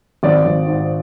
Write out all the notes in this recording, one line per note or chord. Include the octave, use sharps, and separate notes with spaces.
G#1 D5
G#1
G#2